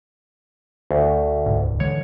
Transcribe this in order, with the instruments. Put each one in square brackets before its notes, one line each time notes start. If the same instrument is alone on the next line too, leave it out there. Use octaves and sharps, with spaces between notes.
[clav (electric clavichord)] D2
[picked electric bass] D#1 C#2 G#2
[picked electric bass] D3 E3 G#3 [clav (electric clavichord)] C#5